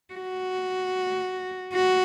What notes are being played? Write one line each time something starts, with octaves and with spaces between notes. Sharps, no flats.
F#4
F#4